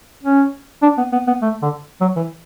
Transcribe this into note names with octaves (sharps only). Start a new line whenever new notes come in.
C#4
D4
B3
B3
B3
A3
D3
F#3
E3